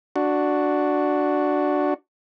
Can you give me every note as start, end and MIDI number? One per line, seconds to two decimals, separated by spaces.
0.16 1.94 62
0.16 1.94 66